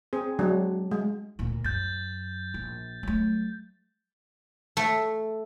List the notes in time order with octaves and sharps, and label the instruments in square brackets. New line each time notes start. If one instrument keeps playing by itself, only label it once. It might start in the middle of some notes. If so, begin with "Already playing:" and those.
[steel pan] C4 G#4
F#3 G#3 D4
G#3
[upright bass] D2 A#2
[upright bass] F#2 [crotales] G6 A6
[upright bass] A#1
F#3 A3
[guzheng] A3